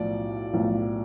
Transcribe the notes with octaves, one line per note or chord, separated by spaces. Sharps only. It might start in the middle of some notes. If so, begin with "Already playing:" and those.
Already playing: B1 A2 F3 D5
B1 A2 F3